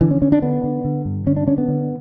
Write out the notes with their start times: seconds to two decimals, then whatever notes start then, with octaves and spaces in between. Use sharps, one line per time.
0.01 D3 E3
0.11 C#4
0.22 D3 C#4
0.32 D4
0.42 D3 B3
0.64 D3
0.85 D3
1.05 G2
1.26 D3 C#4
1.36 D4
1.47 D3 C#4
1.58 B3
1.68 D3